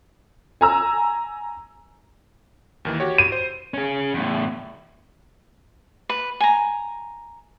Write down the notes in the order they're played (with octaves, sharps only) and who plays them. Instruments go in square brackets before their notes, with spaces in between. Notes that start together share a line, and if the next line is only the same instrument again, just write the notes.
[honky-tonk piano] G#5 A#5 E6
[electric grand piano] D#2 D#3 E3
F#4 G4 C#5
[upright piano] D#7
[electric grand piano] C5
[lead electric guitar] C#4 G#4
E2 A2
[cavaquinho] B4
G#5 A#5